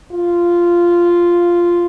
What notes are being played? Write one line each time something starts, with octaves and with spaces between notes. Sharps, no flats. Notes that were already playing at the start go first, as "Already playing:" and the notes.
F4